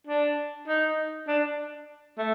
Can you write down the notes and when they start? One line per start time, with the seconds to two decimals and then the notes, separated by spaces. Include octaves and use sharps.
0.07 D4
0.68 D#4
1.28 D4
2.18 A3